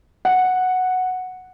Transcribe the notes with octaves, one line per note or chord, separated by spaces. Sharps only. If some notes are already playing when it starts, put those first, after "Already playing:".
F#5